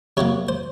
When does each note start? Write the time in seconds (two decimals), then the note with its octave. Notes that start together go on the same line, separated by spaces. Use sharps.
0.17 C3 F#3 A#3 C#5
0.49 C5